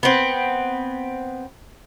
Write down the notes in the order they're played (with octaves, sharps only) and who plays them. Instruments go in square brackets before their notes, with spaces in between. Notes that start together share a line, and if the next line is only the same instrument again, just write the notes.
[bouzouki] B3 C4